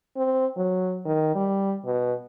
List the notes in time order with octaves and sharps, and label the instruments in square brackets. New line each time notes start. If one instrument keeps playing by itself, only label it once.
[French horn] C4
F#3
D#3
G3
B2